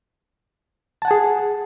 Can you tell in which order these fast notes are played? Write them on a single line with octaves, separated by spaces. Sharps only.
A5 F#5 G#5 G#4